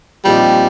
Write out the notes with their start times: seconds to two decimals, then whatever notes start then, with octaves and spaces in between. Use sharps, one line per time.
0.25 A#2 F3 G3 C4 D#4 G4